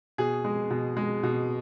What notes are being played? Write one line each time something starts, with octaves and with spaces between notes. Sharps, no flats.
B2 G#4
G#3
B2
G#3
B2